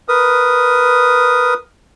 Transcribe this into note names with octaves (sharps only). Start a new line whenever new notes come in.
A#4 B4 D#6